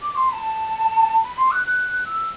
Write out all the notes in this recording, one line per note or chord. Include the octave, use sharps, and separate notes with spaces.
D6
C6
B5
A5
B5
C6
F#6
F#6
E6